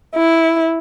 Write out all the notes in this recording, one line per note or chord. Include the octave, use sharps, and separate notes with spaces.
E4